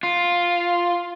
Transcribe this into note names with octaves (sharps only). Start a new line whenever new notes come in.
F4